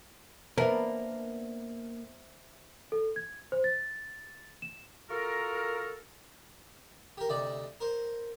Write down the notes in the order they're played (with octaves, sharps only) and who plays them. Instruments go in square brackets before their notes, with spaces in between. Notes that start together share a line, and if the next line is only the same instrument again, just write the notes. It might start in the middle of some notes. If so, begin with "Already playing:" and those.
[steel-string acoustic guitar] A#3 [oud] B3 D4 [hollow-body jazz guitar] A#4 [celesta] C5 E5
[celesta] A4
G#6
C5
A6
E7
[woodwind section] F4 F#4 A4 A#4
[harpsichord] G4 A#4
D2 C3 D#4 D5
A#4 C5